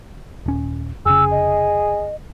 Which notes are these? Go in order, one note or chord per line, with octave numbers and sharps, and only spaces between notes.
D#1 C#4
F1 C#3 G#4 E6
D#5